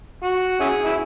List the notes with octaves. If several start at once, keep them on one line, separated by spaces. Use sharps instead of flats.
F#4
C#4 E4 G#4
E4